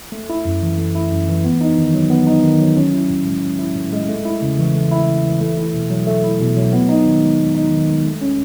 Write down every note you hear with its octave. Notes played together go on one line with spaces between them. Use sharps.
A3
E4
F#2
E3
A3
E4
F#2
E3
B3
D#4
D#3
F#3
B3
D#4
D#3
F#3
C#4
E4
A2
G#3
C#4
E4
A2
G#3
A3
E4
C#3
E3
A3
E4
C#3
E3
A3
E4
B2
F#3
A3
E4
B2
F#3
B3
D#4
D#3
G#3
B3
D#4
D#3
G#3
A3
C#4